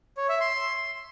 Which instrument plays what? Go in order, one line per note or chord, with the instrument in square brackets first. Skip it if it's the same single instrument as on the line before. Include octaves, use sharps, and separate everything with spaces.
[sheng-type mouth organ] C#5
E5
C6